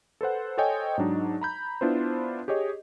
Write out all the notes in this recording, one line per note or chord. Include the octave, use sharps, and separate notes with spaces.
A4 B4 C5 F#5
A4 C5 C#5 D#5 G5 G#5
G#2 F#3 D4 D#4
A#5 B5 G6
B3 D4 E4 F4 B4 C5
G4 G#4 C#5 D#5